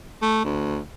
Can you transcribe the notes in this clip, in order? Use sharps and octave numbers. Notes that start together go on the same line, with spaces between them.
A3
D2